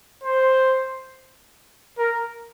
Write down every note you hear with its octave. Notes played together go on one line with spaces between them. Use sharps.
C5
A#4